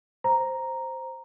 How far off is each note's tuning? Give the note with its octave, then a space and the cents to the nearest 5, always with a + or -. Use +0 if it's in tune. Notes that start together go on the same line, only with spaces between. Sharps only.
C5 +0 A#5 +0